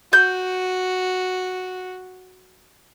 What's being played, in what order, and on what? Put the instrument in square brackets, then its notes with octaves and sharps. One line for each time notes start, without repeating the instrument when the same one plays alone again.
[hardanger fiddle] F#4 [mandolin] G6